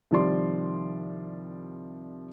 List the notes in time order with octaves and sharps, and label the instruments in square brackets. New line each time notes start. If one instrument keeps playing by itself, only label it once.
[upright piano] C2 D#3 F3 G3 D5 C6